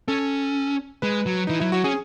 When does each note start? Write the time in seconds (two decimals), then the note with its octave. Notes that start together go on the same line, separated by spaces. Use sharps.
0.08 C#4 A4
1.02 G#3 B4
1.26 F#3
1.47 E3 D#4
1.60 F#3 E4
1.72 F#3 F#4
1.84 C#4 G#4